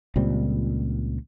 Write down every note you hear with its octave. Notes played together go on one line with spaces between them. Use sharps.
C#2 A#2 G3 C4